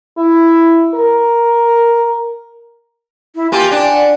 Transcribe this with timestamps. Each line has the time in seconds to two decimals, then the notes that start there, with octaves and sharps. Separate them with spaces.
0.18 E4
0.95 A#4
3.35 E4
3.52 A#3 F4 G4 G#5
3.71 D4 G5
3.90 F#5